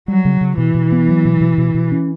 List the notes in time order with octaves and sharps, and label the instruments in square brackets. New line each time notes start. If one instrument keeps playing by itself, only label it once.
[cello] F#3 [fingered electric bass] G3
[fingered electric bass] C#3
C#3
[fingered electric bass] B2 [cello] E3
[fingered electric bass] B2
B3
F#3
B2
B2
B2
B2
C#4